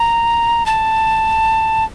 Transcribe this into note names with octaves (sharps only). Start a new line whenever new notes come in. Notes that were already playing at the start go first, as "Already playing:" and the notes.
Already playing: A#5
A5